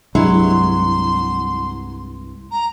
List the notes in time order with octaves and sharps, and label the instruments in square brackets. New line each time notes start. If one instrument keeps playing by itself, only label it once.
[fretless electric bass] C2 G2 D4 [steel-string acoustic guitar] F#3 [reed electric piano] G#3 E4 [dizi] C6
[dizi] A#5